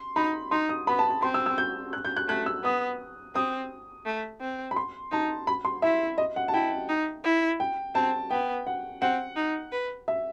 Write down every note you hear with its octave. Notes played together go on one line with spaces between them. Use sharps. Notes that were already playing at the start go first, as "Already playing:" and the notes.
Already playing: C6
D#4 B5
D#4 C6
D#6
B3 B5
A5
A5
C4 C6
E6
E6
G6
F#6
G6
F#6
A3 F#6
E6
B3 D#6
C4 D#6
A3
C4
B5
C6
D#4 A5
B5
C6
E4 E5
D#5
F#5
A5
E4 G5
D#4
E4
G5
C4 A5
B3 G5
F#5
C4 F#5
D#4
B4
E5